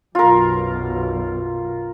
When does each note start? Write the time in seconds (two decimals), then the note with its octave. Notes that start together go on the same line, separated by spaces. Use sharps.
0.15 B1 F#2 B2 F4 A#4